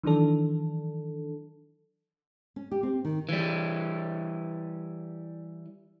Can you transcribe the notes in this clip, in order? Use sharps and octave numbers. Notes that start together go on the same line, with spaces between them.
D#3 E3 F#3 D4 A4
C#4
G4
C4
D#3
E3 G3